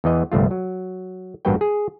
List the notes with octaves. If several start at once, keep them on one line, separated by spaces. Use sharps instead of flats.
E2 E3 D#5
G1 C2 A3 F4
F#3
A1 G2 A#3 F#4 B4 G5
G#4